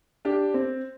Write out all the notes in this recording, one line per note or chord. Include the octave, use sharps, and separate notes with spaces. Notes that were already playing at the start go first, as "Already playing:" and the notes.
D4 G4
C4